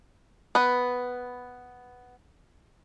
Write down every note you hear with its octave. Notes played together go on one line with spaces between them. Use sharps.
B3 B4